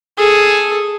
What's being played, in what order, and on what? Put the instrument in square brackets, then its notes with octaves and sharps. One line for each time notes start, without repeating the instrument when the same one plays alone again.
[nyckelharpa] G#4 A4